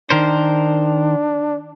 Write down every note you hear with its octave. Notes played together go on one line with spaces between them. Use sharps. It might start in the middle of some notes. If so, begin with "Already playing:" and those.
D#3 D4 A#4 C5